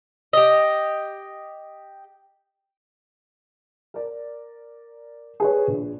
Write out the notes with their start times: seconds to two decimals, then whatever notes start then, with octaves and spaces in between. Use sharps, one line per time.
0.33 G4 D#5
3.94 A#4 D5
5.40 G#4 B4 C#5
5.68 A#1